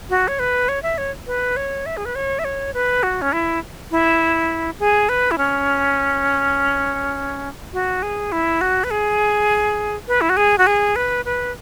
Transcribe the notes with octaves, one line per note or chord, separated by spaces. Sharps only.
F#4
C#5
B4
C#5
E5
C#5
B4
C#5
E5
G#4
B4
C#5
E5
C#5
B4
F#4
C#4
E4
E4
G#4
B4
E4
C#4
F#4
G#4
E4
F#4
B4
G#4
B4
E4
F#4
G#4
F#4
G#4
B4
B4